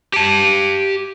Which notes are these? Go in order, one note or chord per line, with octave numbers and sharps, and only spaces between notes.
G4 A5